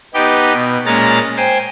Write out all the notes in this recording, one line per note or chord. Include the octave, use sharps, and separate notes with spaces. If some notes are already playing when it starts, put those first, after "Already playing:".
B3 D#4 G4 G5
B2
A#2 G#3 C#4 A#5 A6
C5 G5 G#5